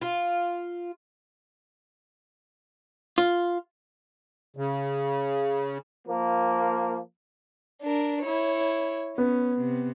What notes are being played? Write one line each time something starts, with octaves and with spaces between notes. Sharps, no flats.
F4
F4
C#3
F3 A#3
D4 A#4
E4 C#5
B3 C#4
C3